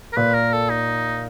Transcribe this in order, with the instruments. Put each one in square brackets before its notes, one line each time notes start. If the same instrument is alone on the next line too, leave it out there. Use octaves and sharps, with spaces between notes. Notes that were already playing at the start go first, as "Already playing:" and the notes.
[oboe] A#4
[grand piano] A#2 [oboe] B4
[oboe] A#4
A4
D#4